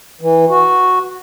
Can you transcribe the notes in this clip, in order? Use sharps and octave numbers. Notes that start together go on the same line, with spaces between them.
E3
F#4